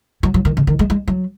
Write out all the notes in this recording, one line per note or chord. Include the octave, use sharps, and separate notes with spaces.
F#3
F#3
D#3
C#3
D#3
G#3
G#3
F#3